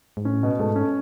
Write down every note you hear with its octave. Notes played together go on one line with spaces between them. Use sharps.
G#2
A2 C#4
B2
G#2 A3
C#4